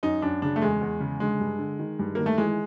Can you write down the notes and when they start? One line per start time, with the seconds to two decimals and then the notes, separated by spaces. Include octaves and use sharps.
0.03 F#2 D#4
0.22 F#2 D4
0.42 C#3 D4
0.56 A3
0.62 E2 G#3
0.81 E2
1.00 C#3
1.20 D3 G#3
1.40 G2
1.59 D3
1.79 D#3
1.99 G2
2.15 D#3 A#3
2.26 A3
2.38 E3 G#3